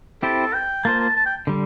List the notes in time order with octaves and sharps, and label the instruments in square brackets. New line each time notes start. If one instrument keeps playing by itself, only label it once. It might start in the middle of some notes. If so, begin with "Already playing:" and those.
[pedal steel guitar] C4 E4 G4 C5 [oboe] A4
[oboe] G5
[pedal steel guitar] A#3 F4 C5 [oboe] A5
[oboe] A5
A5
G5
[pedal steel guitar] D3 G3